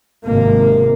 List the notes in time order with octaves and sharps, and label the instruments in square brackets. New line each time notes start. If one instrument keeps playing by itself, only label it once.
[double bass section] G#1 C3 A#3